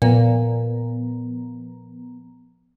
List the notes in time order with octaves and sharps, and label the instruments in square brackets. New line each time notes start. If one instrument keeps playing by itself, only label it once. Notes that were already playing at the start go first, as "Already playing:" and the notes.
[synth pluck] A#2 [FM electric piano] F3 B3 A#5